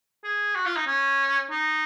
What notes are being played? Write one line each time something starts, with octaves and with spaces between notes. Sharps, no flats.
G#4
F#4
F4
D#4
C#4
D#4